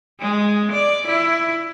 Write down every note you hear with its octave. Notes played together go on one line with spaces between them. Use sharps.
G#3
D5
E4